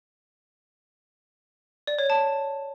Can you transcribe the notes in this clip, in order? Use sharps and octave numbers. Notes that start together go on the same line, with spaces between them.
D5
C#5
A5